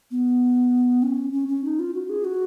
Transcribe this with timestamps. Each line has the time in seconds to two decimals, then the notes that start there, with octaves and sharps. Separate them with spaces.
0.11 B3
1.02 C#4
1.32 C#4
1.48 C#4
1.64 D#4
1.79 F4
1.94 F#4
2.09 G#4
2.25 F#4